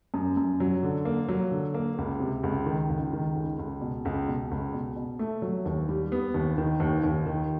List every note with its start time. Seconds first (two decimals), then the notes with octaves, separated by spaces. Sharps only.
0.14 F#2
0.37 F#2
0.60 F#3
0.83 D3
1.05 A#3
1.29 F#3
1.51 D3
1.74 A#3
1.98 C#2
2.20 C3
2.43 C#2
2.66 D#3
2.89 C#2
3.13 D#3
3.36 C#2
3.59 C#2
3.81 B2
4.05 C#2
4.28 B2
4.51 C#2
4.73 B2
4.96 B2
5.19 A3
5.42 F#3
5.65 D#2
5.89 G3
6.12 B3
6.34 D#2
6.58 D#3
6.80 D#2
7.04 D#2
7.26 D#3